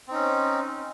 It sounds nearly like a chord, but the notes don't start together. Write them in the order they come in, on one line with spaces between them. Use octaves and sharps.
C4 D#4 C#4